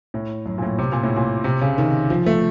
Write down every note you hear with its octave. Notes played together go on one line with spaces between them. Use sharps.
A2
F#2
A#2
A2
C3
A#2
A2
A#2
C3
C#3
D#3
F3
A3